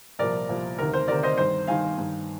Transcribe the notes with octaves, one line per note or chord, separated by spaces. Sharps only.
C2 A#2 F3 A#4 D5
C2 A#2 F3
D2 C3 D#3 A#4
C5
D2 C3 D#3 A#4 D5
C5 D#5
G2 D#3 C5
G2 D#3 F5 G#5
G2 D#3